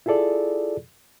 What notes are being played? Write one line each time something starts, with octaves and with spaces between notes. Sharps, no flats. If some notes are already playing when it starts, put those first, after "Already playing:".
E4 F4 G#4 A4 D5